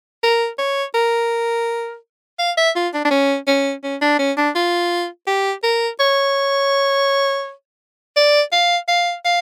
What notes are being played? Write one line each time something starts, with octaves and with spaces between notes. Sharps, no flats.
A#4
C#5
A#4
F5
E5
F4
D4
D4
C#4
C#4
C#4
D4
C#4
D4
F4
G4
A#4
C#5
D5
F5
F5
F5